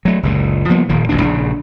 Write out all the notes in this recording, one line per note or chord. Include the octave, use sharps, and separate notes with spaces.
F#3 A3
F#1 C#2 A#2
F3 G3 A#3 B3
D#1 A#2 D#3 A#3
E1 A1 B2 D4
A#1 C#3 D4